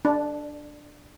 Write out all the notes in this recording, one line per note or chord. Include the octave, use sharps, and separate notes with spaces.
D4